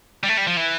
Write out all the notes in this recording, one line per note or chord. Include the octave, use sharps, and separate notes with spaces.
G3
A3
G3
F3
E3